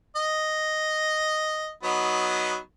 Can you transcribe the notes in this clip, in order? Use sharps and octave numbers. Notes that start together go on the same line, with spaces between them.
D#5
F#3 B3 D#4